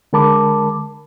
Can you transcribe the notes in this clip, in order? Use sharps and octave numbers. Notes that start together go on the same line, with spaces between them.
D3 G#3 A#4 A5 B5 D6